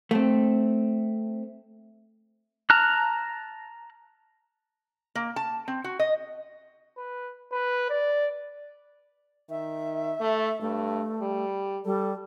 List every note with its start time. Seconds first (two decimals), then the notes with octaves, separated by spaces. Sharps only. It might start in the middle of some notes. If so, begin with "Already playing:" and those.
0.11 A3 C4
2.70 A5 A#5 F6 F#6
5.15 A#3
5.36 A5
5.68 C4
5.84 F#4
5.99 D#5
6.97 B4
7.52 B4
7.90 D5
9.50 D#3 E5
10.20 A3
10.61 G2 A3
11.21 G3
11.85 G3 A4